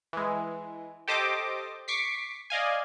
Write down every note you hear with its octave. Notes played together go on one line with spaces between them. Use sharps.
E3 G#3
G4 A4 C5 D#5 D6
C#6 D6 B6 C7
D5 D#5 F5 G#5